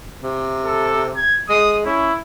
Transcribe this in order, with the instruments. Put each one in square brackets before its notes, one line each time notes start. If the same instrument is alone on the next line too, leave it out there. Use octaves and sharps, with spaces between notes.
[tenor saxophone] C3
[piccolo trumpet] A4
G#6
[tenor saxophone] G#3 [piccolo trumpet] D#6
[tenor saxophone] C#4 [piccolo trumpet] E4